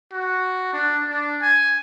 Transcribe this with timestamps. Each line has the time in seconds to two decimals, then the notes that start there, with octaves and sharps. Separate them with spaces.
0.12 F#4
0.73 D4
1.09 D4
1.42 G#5